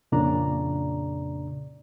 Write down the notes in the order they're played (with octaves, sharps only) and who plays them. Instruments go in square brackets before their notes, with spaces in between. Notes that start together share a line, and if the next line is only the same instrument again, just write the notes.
[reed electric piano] F2 A#2 C#3 D4 D5 A#5